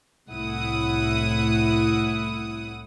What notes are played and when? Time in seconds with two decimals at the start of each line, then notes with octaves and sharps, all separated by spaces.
0.29 C2 A2 E4 F#5 D#6